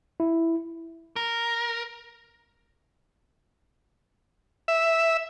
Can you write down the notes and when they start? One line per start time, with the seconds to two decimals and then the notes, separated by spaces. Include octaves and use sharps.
0.20 E4
1.16 A#4
4.68 E5